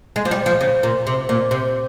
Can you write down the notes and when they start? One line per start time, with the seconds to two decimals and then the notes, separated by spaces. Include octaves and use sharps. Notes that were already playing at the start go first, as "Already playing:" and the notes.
0.16 G#3
0.25 F3
0.31 G3
0.46 F3
0.61 C#3
0.83 A#2
1.07 C3
1.29 A#2
1.51 C3